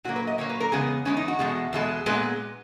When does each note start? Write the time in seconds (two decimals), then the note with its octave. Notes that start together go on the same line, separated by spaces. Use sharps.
0.04 A#2 F#3 A#3 F#4
0.16 B4
0.27 D#5
0.38 A#2 F#3 A#3 C#5
0.49 B4
0.60 A#4
0.72 E2 C#3 G#3 B3 G#4
1.05 E2 C#3 G#3 B3 C#4
1.17 D#4
1.28 F#4
1.39 E2 B2 G#3
1.73 E2 B2 G#3
2.06 A#2 G#3 B3 F#4